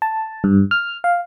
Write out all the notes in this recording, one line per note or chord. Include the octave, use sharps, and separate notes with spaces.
A5
G2
F6
F5